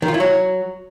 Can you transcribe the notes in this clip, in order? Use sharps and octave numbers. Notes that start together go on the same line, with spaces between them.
D#3
F4
E4
F#3